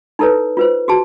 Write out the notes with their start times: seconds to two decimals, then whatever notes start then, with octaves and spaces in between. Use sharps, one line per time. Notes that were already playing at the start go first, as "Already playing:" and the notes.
0.19 D#4 E4 A4 B4 C#5
0.57 F4 B4 C5
0.88 F#4 G#4 A5